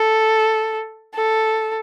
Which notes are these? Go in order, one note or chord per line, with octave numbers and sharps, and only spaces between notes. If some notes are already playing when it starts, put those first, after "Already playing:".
Already playing: A4
A4